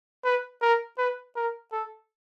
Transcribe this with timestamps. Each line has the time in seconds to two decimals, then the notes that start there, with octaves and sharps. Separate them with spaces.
0.24 B4
0.62 A#4
0.98 B4
1.36 A#4
1.72 A4